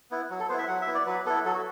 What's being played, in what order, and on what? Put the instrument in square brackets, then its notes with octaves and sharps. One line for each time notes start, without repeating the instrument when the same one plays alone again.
[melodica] B3 E4
F#3
A4
B3 E4 C5
E5
F#3 F#5
E5
B3 E4
D5
F#3 B4
B3 E4 A4
F#3 A4
F#4